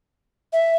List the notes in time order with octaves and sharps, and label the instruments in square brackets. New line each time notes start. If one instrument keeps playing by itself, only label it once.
[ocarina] E5